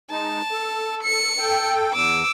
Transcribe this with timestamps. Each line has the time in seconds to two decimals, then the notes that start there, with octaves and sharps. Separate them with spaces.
0.11 G#3 D#4 A5
0.51 A4
1.03 C#7
1.39 A4 G5
1.93 E2 D6 E6